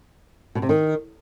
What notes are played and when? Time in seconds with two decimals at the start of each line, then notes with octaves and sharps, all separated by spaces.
0.55 B2
0.62 C3
0.69 D#3